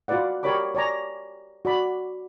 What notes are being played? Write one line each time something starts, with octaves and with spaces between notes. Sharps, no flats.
F4 F#4 B4 D5 F#5
G4 A#4 C#5 D5 B5 D6
C#5 D5 G#5 A#5
F#4 D5 B5